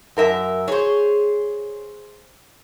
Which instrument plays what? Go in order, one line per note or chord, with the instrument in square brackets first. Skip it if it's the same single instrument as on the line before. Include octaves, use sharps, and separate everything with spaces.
[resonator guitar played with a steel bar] F#2 A#4 E5
[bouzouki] G#4 C5 [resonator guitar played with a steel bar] C#5